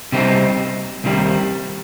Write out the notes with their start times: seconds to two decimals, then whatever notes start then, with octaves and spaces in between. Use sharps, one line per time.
0.12 C3 G3 C4 D#4
1.04 C2 C3 D#3 G3